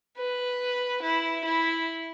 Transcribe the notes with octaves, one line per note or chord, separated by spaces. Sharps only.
B4
E4
E4